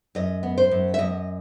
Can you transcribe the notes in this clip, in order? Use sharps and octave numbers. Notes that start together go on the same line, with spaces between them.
F#2 D#5
B3
C5
F#2
E5
F#2 D#5